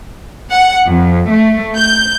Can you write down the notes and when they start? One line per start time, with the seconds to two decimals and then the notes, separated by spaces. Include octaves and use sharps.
0.50 F#5
0.87 F2
1.31 A3
1.77 G6